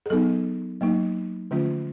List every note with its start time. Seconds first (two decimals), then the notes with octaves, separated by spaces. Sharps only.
0.06 G#4
0.10 F#3 B3 D#4 A4
0.81 F#3 A#3 D#4
1.51 D3 F3 A3 C#4 F4